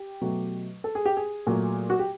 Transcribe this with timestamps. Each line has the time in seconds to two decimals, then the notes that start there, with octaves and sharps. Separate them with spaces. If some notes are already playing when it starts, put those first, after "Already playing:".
Already playing: G4
0.21 B2 F#3 A3
0.84 A4
0.95 G#4
1.05 G4
1.17 G#4
1.47 A#2 F#3 A3
1.90 F#4
1.99 G4